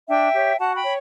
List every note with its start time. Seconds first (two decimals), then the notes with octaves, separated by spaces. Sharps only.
0.08 D4 E5 G5
0.34 G4 C#5
0.58 F#4 F#5 A5
0.75 G5 B5
0.84 C#5